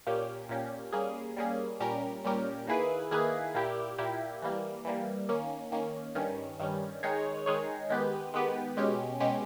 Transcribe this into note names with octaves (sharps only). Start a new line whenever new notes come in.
A#2 A#3 C#4 G4
A#2 A#3 C#4 G4
G3 A#3 C#4 G#4
G3 A#3 C#4 G#4
A#2 G3 C#4 G4 A#4
A#2 G3 C#4 G4 A#4
D#3 A#3 E4 G#4 B4
D#3 A#3 E4 G#4 B4
A#2 A#3 E4 G4
A#2 A#3 E4 G4
E3 G3 A#3
E3 G3 A#3
D#3 A#3 C#4
D#3 A#3 C#4
G2 D#3 G3 C#4
G2 D#3 G3 C#4
D#3 G#3 D#4 G#4 C#5
D#3 G#3 D#4 G#4 C#5
D#3 G#3 B3 G4 B4
D#3 G#3 B3 G4 B4
B2 G#3 C#4 G4
B2 G#3 C#4 G4